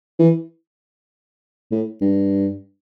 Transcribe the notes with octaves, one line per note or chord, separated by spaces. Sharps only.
E3
A2
G2